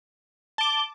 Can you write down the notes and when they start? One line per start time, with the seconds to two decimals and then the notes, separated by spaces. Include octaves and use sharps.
0.58 A5 D6 G7